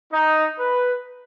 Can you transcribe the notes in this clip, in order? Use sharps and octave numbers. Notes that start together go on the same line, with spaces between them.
D#4
B4